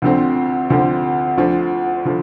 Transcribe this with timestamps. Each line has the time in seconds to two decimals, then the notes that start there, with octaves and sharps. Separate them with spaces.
0.02 D2 D3 F3 C4
0.70 D2 D3 F3 C4
1.38 D2 D3 F3
2.05 D3 F3